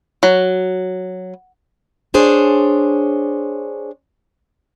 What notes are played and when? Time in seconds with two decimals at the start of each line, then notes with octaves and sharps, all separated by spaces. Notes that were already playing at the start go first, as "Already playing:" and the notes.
0.23 F#3
2.14 D4 G#4 C5 C#5